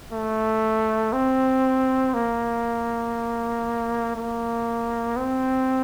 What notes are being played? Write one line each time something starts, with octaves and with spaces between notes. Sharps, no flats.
A3
C4
A#3
A#3
C4